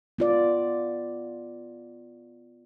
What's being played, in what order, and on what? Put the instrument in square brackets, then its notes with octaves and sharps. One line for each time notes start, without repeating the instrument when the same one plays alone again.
[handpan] B3 F4 D5